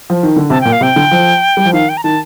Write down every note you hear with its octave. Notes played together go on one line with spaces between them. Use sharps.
F3
D#3
D3
C3 A5
A#2 G5
F5
C3 G5
D3
F3
G3
F3
D#3 F5
G5
A#5
D#3 A5